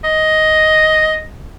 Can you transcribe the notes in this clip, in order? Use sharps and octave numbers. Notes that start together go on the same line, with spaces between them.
D#5